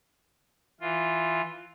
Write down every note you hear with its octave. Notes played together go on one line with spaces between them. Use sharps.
E3 F4